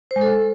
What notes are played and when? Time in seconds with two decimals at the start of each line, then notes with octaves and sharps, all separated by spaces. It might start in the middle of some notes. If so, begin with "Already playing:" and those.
0.11 C5
0.16 G#3
0.21 A4